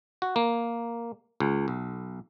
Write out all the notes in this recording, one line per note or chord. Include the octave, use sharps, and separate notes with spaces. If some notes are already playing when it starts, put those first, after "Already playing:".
F#4
A#3
C#2
B1